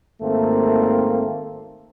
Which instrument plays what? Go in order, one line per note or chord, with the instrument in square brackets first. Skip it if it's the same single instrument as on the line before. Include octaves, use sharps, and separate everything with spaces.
[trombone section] G#1 A3 A#3 C4